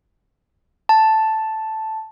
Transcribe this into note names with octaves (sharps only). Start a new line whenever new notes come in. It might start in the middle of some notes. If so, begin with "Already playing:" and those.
A5